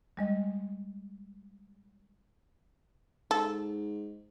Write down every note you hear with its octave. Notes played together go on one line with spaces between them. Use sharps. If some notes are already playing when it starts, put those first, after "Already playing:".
G3 G#3 D#5
G#2 A4